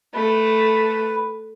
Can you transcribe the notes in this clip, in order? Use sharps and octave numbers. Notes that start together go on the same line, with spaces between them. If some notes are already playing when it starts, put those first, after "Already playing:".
A3 B4